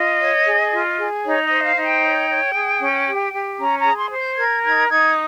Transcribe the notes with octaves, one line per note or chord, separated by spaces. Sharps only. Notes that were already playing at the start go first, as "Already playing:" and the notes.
Already playing: F4 D#5
C#5
G#4
F4
G#4
D#4 C#5
D#5
C5
F5
D#4
G5
C#5
C#5
G#4
C#4
G4
G4
C#4 A#5
A#5
G#4
C6
C5
G6
A#4 G#6
D#4 G#6
D#4 G#6